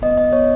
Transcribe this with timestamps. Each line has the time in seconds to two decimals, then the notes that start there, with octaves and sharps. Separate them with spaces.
0.02 B3 D#5
0.17 B3 D#5
0.33 B3 C#5